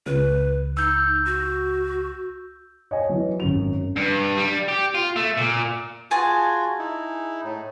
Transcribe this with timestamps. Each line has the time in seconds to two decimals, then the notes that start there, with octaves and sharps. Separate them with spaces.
0.06 C#2 B4
0.77 D#4 E6 G6
1.25 F#4
2.91 C#5 D#5 G#5
3.09 E3 F#3
3.40 G#1 F#2 F7
3.96 G2
4.38 G3
4.69 G4
4.95 F4
5.16 A3
5.37 A#2
6.11 F4 F#4 G#4 G#5 A5
6.78 D#4 E4
7.44 A2